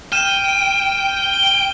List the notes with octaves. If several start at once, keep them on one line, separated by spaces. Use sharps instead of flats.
G5 F6 D#7 E7
G7